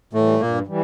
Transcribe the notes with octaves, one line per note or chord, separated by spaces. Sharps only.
A2 E3 G3 A3
G2 A#2 A#3
E3 G3